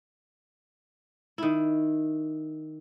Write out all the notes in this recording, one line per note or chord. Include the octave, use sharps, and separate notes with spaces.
D#3 E4